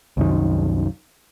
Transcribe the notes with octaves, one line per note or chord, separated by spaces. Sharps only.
C2 F#2 D#3